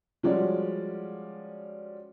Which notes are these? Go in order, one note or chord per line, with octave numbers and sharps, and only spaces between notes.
F3 G3 G#3 C#4 F#4 D5